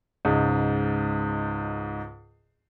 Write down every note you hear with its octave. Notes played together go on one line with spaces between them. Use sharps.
C#2 G#2